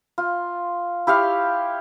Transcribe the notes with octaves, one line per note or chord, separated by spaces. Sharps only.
F4
E4 G4 C#5 F5